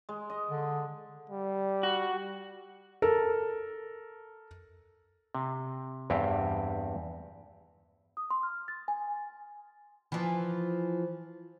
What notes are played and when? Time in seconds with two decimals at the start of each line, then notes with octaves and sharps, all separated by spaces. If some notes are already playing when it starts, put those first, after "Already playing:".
0.09 G#3
0.30 D#5
0.50 D3
1.30 G3
1.83 F#4
3.02 A4 A#4
5.35 C3
6.10 E2 G2 C4 G4
8.17 D#6
8.30 C6
8.43 F6
8.68 A6
8.88 G#5
10.12 E3 F3